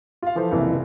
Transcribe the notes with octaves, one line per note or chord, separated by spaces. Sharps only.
F4 F5
E3 F3 A4 C5
F#1 C2 E3